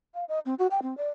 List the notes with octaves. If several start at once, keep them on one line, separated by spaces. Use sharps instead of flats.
F5
D#5
C4
F#4
G5
C4
D5